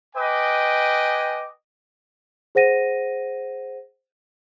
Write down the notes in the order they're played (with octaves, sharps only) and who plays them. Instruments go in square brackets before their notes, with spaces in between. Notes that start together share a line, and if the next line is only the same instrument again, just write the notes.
[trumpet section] B4 D#5 G5 G#5 D6
[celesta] G#4 C5 F#5 A#6 D#7